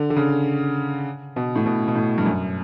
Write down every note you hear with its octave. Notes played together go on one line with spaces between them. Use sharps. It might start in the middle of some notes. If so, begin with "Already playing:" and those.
Already playing: D3
D3
C#3
B2
A2
B2
B2
A2
G2
F#2